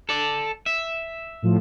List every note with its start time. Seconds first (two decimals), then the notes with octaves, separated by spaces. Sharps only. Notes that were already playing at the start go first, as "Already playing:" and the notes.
0.09 A4 D5
0.66 E5
1.42 A2 F3